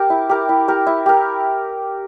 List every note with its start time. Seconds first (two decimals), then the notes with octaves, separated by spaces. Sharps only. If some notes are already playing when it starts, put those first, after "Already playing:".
Already playing: G4 A#4
0.10 E4
0.29 G4 A#4
0.49 E4
0.68 G4 A#4
0.87 E4
1.06 G4 A#4